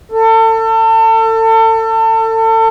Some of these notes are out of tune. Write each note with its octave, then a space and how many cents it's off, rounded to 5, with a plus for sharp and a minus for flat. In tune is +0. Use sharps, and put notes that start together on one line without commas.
A4 +30